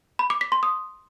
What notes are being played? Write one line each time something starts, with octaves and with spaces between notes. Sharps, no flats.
B5
D6
B6
C6
D#6